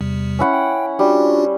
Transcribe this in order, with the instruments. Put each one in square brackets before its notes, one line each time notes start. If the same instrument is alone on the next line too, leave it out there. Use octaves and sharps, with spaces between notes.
[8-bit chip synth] E2 C3 G3
[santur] C#4 E4 F#5
[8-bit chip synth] G5
[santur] G3 [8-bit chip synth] D4 F4 F#4